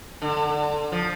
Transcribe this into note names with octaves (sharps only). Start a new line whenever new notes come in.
D3
F3